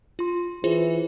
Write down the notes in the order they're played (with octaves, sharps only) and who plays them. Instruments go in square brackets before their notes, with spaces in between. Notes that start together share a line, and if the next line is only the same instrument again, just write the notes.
[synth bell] F4 C6
[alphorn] E3 [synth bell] F4 G#4 C5